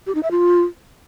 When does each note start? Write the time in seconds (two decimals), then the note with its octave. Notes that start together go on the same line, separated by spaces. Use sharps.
0.06 G4
0.15 D#4
0.23 E5
0.31 F4